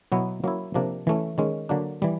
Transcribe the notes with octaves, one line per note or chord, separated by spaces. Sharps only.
B2 F#3 B3 E4
F#3 A#3 C#4 E4
C3 F3 A#3 D4
E3 A3 C#4
D#3 G#3 C#4
D3 F#3 A#3 D4
E3 G3